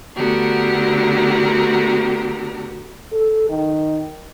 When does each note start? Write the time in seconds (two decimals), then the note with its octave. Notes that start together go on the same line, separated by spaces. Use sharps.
0.16 D3 A3 B3 F#4 G4 A#4
3.12 A4
3.49 D#3